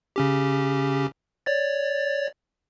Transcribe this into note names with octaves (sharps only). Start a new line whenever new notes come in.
C#3 C#4 G4
C#5 D5 A6